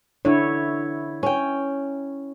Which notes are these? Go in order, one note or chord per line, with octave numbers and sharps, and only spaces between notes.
D3 E4 C#5
C#4 G5